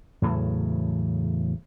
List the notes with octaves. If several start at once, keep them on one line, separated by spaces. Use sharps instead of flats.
E2 A2 C#3 F#3